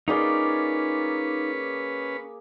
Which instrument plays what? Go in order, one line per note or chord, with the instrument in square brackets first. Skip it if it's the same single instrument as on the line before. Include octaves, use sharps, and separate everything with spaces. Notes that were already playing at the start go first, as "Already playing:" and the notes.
[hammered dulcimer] A#3 G#4 D5 [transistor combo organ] C#4 B4 [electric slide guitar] D#4 F4